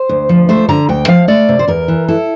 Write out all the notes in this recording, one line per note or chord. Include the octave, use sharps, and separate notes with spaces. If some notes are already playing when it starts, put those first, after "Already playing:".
Already playing: C5
D2
F3
A3 C5
D3 A#5
D2 G5
F3 F5
A3 D5
C3
C5
E2 A#4
E3
E4 A4